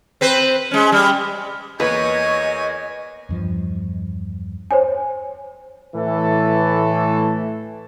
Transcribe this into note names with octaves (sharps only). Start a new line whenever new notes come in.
C4 B4 C5
G#3 C#4
G3
E2 A#3 B4 C#5 D#5 G#5 C#6
E2 G2 F3
C5 C#5 G#5
A2 E3 A3 A4